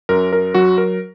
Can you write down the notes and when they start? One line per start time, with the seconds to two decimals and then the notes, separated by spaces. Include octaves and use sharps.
0.09 F#2 A#4
0.33 A#4
0.54 F#3 F#4
0.78 A#4